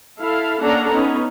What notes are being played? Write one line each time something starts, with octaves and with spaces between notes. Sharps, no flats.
E4 A4 F5
A#3 C#4 D4 A4 F#5 A#5
B3 C#4 D#4